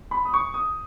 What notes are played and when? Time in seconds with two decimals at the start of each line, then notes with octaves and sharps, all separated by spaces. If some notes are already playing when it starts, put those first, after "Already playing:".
0.11 B5
0.25 D#6
0.34 C#6
0.54 D#6